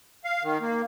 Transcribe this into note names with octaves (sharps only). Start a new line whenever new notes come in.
F5
D#3
A#3